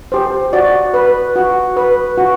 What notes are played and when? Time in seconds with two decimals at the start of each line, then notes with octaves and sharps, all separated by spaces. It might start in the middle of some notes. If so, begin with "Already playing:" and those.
0.12 G4 C5
0.53 F#4 D5
0.94 B4
1.36 F#4
1.77 B4
2.18 F#4